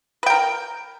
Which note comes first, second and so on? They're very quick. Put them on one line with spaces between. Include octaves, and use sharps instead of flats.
B4 G5 A#4